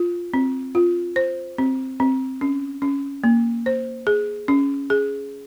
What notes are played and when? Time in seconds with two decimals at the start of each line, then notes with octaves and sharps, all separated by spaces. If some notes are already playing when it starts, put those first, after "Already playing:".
Already playing: F4
0.34 C4
0.75 F4
1.16 C5
1.58 C4
2.00 C4
2.41 C#4
2.82 C#4
3.24 A#3
3.66 C5
4.07 G#4
4.48 C#4
4.90 G#4